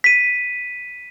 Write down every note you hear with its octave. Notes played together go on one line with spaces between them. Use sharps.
B6 D#7